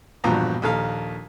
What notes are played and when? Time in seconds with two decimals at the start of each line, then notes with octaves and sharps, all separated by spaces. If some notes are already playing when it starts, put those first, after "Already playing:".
0.24 A#1 E2 G2 B2 F3 A#5
0.62 A#1 D#2 A4 F5